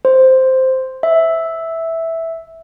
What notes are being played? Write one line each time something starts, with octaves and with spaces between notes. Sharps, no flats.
C5
E5